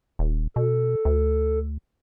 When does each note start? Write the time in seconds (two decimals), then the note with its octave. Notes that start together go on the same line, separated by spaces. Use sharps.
0.19 D#1
0.56 B2 A4
1.05 D2